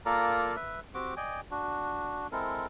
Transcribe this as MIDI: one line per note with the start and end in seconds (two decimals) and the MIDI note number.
0.06 0.56 58
0.06 0.56 65
0.06 0.56 69
0.06 0.56 70
0.06 0.56 74
0.06 0.56 82
0.56 0.80 71
0.56 0.80 76
0.94 1.14 60
0.94 1.14 66
0.94 1.14 67
0.94 1.14 86
1.17 1.40 74
1.17 1.40 75
1.17 1.40 79
1.17 1.40 80
1.51 2.27 62
1.51 2.27 66
2.32 2.66 56
2.32 2.66 60
2.32 2.66 64
2.32 2.66 69
2.32 2.66 70